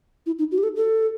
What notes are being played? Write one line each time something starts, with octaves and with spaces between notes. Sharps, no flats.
E4
D#4
F#4
G4
A4
A4